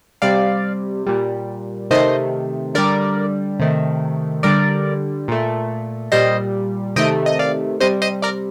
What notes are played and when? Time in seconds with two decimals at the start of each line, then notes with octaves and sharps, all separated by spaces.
0.22 C3 G3 D5 F5
1.07 A#2 G3
1.91 C3 D#3 A3 C5 D#5
2.75 D3 G3 A#4 D5
3.60 C3 D#3 A3
4.43 D3 G3 A#4 D5
5.28 A#2 A3
6.12 A#2 G3 C5 D#5
6.96 C3 D#3 A3 D#5 G5
7.26 D#5
7.39 D5 F5
7.80 C3 G3 C5 D#5
8.02 C5 D#5
8.22 A#4 D5